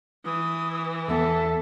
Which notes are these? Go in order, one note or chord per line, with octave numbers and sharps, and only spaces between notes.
E3 D#6
E2 B3 A4 E5 G#5